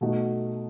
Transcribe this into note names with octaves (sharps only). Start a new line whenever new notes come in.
B2 A3 D#4 F#4